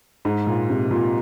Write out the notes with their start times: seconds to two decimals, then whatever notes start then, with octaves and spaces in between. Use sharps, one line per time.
0.25 G#2
0.47 A#2
0.70 C3
0.91 A#2